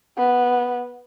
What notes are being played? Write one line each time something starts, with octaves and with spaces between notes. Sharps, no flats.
B3